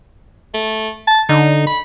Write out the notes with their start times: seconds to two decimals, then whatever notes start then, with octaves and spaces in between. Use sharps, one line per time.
0.54 A3
1.07 A5
1.29 D3 D#4
1.67 B5